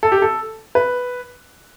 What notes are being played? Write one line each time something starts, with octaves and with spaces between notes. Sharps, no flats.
A4
G4
A4
B4